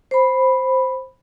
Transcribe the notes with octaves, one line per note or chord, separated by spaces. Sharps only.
C5 B5